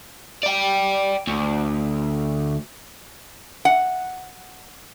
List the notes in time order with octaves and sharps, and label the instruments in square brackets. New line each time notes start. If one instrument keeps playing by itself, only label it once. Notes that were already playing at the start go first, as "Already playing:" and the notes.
[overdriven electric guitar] D5 G5
D2
[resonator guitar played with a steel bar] F#5